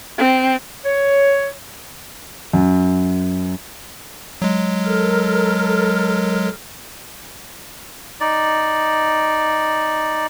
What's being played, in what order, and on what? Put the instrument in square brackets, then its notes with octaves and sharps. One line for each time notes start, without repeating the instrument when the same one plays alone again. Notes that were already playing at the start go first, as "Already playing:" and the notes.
[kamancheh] C4
[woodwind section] C#5
[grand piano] F#2
[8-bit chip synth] F#3 G#3
[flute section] A4 A#4 F6
[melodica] D#4 D5